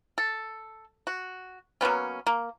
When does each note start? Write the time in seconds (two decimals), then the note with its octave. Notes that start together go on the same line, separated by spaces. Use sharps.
0.18 A4
1.07 F#4
1.81 F#3 A#3 B3 C#4
2.27 A#3